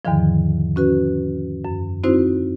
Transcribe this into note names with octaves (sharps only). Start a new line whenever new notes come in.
E2 G#2 D3 D#3 F3
C#4 F#4 B4
F#2
C4 D#4 E4 F#4 C5